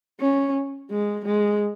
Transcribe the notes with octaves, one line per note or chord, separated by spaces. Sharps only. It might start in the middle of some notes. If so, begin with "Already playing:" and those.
C#4
G#3
G#3